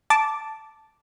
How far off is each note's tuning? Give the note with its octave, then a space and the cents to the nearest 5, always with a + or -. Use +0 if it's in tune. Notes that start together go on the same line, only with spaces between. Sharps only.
A5 +0 D6 +0